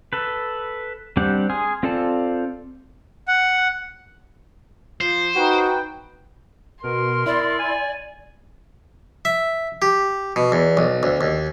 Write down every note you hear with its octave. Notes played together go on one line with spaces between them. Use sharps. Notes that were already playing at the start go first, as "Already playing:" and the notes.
A4 B4
G3 C4 D4 G4 F#5
G#4 G#5 C6 F6
C4 F4 A4 D5 A5
F#5
F3 C5
D#4 F#4 B4 G5
B2 A#4 C6
E4 D5
G#5
E5
G4
B2
E2
B1
D2
D#2